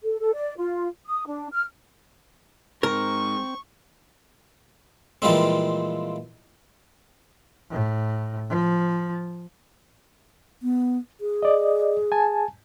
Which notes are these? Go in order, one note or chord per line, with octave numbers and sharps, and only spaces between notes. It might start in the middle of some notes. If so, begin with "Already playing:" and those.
A4
A4
D5
F4
D#6
D4
F6
G#2 C4 A#4 C#6
A#2 E3 F3 G3 G#3 C4
A2
F3
B3
G#4
D5 D#5
G#5 A5